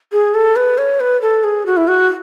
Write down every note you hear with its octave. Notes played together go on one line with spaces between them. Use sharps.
G#4
A4
B4
C#5
B4
A4
G#4
F#4
E4
F#4